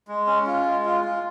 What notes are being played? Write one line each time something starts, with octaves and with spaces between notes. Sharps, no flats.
G#3
C#4
F4
G#3
F4
F4